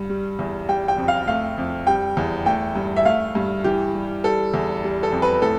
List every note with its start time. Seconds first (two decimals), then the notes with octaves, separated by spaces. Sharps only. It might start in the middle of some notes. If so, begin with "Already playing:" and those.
Already playing: G2
0.09 G3
0.39 E2
0.68 G3 G5
0.88 G5
0.98 F2
1.08 F5
1.27 A3 F5
1.58 F2
1.87 G3 G5
2.17 E2
2.46 A3 G5
2.76 G2
2.96 E5
3.05 A3 F5
3.35 G2
3.64 E3 G4
3.95 G3
4.24 G3 A4
4.54 E2
4.84 G3
5.03 A4
5.12 F2
5.22 B4
5.42 A2 A4